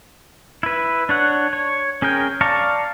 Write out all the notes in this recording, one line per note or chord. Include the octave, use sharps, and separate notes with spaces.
E4 B4
D4 C#5 F#5
C#5
C#4 G#4 A#4 G5
D5 F5 A5 A#5 C#6